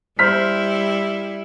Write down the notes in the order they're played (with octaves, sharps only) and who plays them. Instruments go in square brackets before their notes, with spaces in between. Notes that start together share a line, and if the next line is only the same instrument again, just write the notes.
[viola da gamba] G3 E4 [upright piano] C5 F6 B6